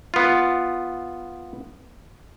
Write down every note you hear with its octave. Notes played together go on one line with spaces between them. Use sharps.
B3 F4